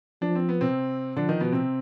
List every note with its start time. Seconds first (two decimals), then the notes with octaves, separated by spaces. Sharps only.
0.22 F3 D4
0.35 C4
0.49 B3
0.61 C3 C4
1.16 D3 F3 D4
1.29 D#3 D#4
1.40 B2 B3
1.52 C3 C4